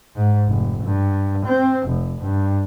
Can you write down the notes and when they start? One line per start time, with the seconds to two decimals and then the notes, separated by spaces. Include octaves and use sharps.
0.16 G#2
0.48 F1
0.84 G2
1.46 C4
1.87 F1
2.21 G2